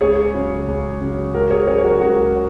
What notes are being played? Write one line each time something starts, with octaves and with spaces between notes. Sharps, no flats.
C#2 G#4 C#5
C#3 F#3
C#2
C#3 F#3
C#2 F#4 A#4
G#4 C#5
C#3 F#3 G#4 C#5
C#5
F#4 A#4
C#2 F#4 A#4